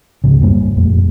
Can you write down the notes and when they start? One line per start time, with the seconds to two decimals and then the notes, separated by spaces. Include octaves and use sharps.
0.24 C#2 G#2 C#3
0.41 F#2 G3 A#3
0.77 F2 A#2 A3